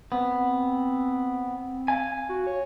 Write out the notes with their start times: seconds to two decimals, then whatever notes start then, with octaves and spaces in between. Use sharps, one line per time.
0.12 B3 C4
1.88 F5 G#5
2.29 F#4
2.47 C#5